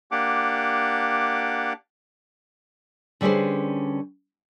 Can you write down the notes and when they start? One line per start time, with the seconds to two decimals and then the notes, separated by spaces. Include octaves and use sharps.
0.12 A#3 D4 G4 F#5 D6
3.21 D3 G3 C#4 G#4 B4 C5